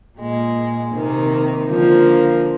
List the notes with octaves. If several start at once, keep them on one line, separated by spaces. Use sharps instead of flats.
A#2 G#3
C3 D#3 A#3
D3 F3 A#3